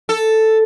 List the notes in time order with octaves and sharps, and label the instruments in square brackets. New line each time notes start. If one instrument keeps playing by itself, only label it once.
[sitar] A4